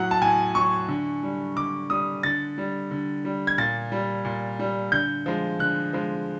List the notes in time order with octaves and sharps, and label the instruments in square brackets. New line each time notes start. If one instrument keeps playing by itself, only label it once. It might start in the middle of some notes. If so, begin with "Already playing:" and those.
Already playing: [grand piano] A2 F#3 F#5
A5
A2 G#5
F#3 C#6
D3
G3
D3 D6
G3 D#6
D3 A6
G3
D3
G3
G#6
A#2 A6
G3
A#2
G3
D3 G6
F3 G#3
D3 F#6
F3 G#3